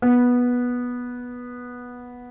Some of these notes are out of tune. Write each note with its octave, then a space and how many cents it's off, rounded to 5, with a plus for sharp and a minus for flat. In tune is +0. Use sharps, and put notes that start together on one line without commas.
B3 -10